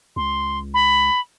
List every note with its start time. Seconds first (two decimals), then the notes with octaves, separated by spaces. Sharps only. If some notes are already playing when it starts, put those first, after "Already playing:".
0.16 C#2 C6
0.74 B5